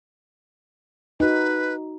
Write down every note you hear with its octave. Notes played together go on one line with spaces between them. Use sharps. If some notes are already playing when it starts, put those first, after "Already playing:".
D#4 F#4 B4